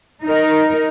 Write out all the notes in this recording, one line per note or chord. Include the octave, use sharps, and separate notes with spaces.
D#4 A#4